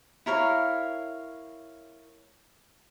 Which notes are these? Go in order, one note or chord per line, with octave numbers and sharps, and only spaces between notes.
E4 A#4 C#5 F5